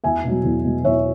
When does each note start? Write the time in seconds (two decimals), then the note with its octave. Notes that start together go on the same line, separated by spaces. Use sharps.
0.04 E2 E5 G#5
0.24 B2 F#3
0.44 E2
0.64 B2 F#3
0.84 E2 C#5 E5